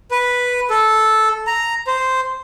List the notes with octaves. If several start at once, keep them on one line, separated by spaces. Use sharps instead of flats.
B4
A4
A#5
C5